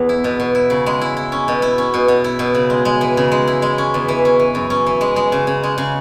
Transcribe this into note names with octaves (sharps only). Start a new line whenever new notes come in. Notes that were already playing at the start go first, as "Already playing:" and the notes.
Already playing: E2 G#3 B3
E4
B2
B2
E4
C#3
G#3
E4
E4
C#4
B2
E4
C#4
B2
B2
E4
B2
C#3
G#3
G#3
E3
C#3
G#3
E4
G#3
C#4
E2
E3
C#4
E3
F#2
C#4
E3
G#3
G#3
C#3
C#3
G#3
C#3